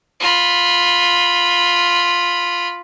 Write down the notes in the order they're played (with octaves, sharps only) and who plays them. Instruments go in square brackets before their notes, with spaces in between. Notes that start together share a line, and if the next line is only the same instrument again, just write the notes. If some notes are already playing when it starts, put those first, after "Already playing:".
[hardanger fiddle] F4 B5